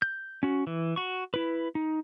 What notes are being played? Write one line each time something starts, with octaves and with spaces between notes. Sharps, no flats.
G6
C#4 F#4
E3
F#4 C#6
E4 B4
D#4